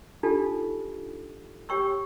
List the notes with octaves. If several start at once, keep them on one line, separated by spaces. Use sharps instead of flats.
D4 D#4 F4 G4 A4
G4 C#5 G5 C#6 E6